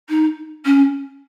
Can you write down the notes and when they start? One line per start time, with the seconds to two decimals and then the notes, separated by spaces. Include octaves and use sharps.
0.09 D#4
0.65 C#4